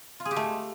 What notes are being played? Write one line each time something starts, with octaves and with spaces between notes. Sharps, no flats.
F4
G#4
G4
A3